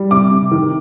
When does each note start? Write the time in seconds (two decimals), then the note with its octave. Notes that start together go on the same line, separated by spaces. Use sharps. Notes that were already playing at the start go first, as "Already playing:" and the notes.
Already playing: G3
0.11 C3 D6
0.31 C3
0.52 D#3